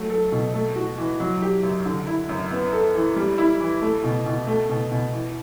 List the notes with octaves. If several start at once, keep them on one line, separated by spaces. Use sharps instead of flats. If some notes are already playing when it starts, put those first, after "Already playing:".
Already playing: F#3 A3
A4
B2
A3
F#4
E3
F#3
G4
F#2
D3
E4
F#2
B3
A4
E3
G3
E4
E3
A3
B2
B2
A3
B2
B2
E3